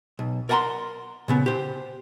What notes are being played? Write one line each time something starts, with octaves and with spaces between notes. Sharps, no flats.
B1
A#4 D5 F#5 G#5 A#5 C6
A#2 C#3 B3
G4 C5